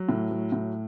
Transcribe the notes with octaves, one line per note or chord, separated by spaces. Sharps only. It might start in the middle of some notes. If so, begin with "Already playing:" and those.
Already playing: F#3
A2
F#3
A2